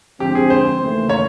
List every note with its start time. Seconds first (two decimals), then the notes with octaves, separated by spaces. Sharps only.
0.20 D3 F3 G#3 C4 G4
0.35 G#4
0.50 C5
0.80 D#2 C#3 E3 A3
1.09 C#5